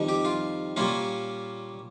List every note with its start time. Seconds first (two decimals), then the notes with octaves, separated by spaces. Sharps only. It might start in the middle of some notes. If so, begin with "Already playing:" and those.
Already playing: F2 D#3 G3
0.09 G4
0.25 F4
0.76 A#2 G3 A#3 C#4 F4